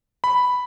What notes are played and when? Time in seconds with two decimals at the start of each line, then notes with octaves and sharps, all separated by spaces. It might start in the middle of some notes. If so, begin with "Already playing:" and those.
0.24 B5